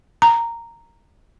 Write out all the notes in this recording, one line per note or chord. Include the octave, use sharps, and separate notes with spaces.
A#5